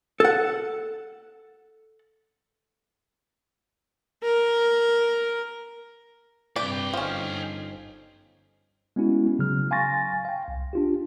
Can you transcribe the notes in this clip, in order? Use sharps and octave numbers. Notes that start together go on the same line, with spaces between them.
A4 F#5
A#4
G2 C3 G#4 B4 D5 G5
G1 F3 C#4 D#4
G#3 B3 C#4 E4 F#4
C#3 F#3 F6
F5 G#5 C6 C#6 A6 A#6
F5 G5
C2
D4 F4 G4